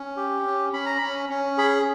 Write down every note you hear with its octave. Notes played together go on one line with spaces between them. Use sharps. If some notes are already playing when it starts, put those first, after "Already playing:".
Already playing: C#4
G4
C#4
C#4 B5
A#5
C#4 B5
C#4
G#4 B5